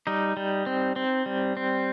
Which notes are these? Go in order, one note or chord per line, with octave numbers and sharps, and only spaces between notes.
G3 D#4
G3
C4
C4
G3
C4